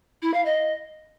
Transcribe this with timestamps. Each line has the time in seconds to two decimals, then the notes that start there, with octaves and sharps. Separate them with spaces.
0.22 E4
0.33 F5
0.45 D#5